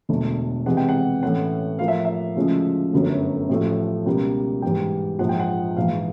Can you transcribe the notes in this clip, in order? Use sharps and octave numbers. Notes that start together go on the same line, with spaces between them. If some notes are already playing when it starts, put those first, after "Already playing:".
E1 D2 D3
C2 C3 E3 G#3 F#5
G5
F#5
A2 E3 A3 C#4 F#5
A2 F3 A#3 F5
E5
E5
D2 C#3 F3 G#3
G1 F#2 D3 F#3 A3
A1 A2 F3 A3
C#2 B2 G3 A#3
G#2 E3 G3 G5
A#1 G#2 F3 F#5
G5
F#5
A#1 G#2 E3 F5